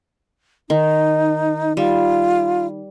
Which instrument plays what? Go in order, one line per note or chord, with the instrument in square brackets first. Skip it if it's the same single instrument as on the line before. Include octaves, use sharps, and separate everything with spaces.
[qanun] D#3 [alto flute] D#4
[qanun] G3 [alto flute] F4